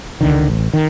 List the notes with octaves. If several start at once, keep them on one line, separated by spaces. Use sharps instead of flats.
C#2 D3 D#3
A1
D#3